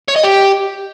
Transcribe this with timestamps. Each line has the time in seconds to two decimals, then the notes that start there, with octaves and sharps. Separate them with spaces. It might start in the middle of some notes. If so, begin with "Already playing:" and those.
0.08 C#5
0.16 D#5
0.23 G4